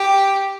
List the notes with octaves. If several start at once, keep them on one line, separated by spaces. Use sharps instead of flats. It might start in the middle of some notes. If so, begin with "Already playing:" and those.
Already playing: G4